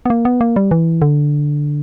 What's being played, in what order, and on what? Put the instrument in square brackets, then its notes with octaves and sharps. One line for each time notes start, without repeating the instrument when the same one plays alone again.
[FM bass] B3
A#3
B3
A#3
G3
E3
D3